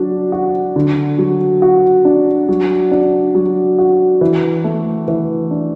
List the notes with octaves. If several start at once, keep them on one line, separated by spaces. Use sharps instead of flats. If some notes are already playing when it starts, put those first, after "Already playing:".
Already playing: F#3 D4
F#4
D3
F#3
F#4
D4
F#3
D4
F#3
F#4
E3
A3
E3
D4